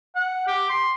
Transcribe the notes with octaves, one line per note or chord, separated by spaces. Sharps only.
F#5
G4
C6